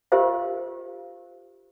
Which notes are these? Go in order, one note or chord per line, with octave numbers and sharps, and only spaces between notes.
F4 G4 A#4 C5 E5 F5